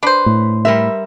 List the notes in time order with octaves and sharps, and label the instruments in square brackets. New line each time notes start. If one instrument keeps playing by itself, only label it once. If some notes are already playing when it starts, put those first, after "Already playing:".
[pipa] D4 C5 [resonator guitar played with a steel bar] B4
[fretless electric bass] A2
[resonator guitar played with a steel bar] G3 A#4 E5